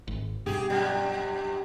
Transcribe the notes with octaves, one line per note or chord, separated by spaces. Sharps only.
G#1
G2 B2 G4 G#4
F2 G3